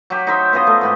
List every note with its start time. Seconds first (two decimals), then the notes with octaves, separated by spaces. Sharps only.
0.10 F#3 G4
0.27 D#4 C5 E5
0.53 B3 F4 G#4 D#5
0.67 A3
0.81 G#2 B3 G4